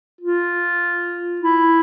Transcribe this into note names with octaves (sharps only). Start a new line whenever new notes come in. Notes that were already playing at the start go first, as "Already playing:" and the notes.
F4
E4